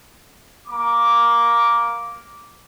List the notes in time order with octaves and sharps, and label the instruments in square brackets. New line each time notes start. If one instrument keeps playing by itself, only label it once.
[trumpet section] A#3 A#5 D6